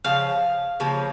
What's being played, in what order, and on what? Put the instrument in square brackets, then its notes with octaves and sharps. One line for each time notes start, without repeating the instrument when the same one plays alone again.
[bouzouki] C#3 F3 F5
C#3 F3 A#3